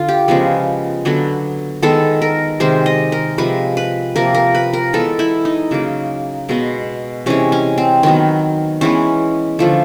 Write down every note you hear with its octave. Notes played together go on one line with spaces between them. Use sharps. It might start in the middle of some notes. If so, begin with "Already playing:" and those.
Already playing: D3 F4
G4
C#3 F3 G#3 B3
D3 F#3 B3
D#3 G#3 B3 A4
A#4
C3 D#3 G#3 C5
D#5
A#4
C3 F3 G#3 B4
B4
C3 F3 A#3 A#4
A#4
B4
A#4
E3 G#3 B3 A4
E4
D#4
C#3 F#3 A#3
B2 G#3 B3
C3 E3 G#3 C#4
C#4
C4
D#3 F#3 B3
E3 G#3 B3 C#4
D3 F3 A3